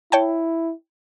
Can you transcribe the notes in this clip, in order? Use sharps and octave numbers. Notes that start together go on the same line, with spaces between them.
E4 C#5 G5 A5